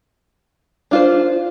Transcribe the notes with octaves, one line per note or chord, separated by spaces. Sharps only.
D4 F4 C5